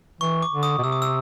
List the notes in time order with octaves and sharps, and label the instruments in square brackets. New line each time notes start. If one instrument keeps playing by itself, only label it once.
[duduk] E3 [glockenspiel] C#6
[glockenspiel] D6
[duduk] D3
[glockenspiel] D#6
[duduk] B2
[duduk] C3 [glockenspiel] E6
[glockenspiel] D#6
E6